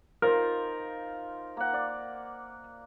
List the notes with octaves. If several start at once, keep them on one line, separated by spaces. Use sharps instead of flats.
D#4 F4 A#4 C5
A#3 F#5
D5